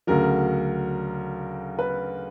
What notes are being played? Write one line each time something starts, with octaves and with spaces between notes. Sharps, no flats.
D2 C#3 F#3 A#4
B4